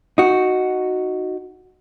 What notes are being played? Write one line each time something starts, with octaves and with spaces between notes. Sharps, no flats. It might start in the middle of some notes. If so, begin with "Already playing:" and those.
D#4 F#4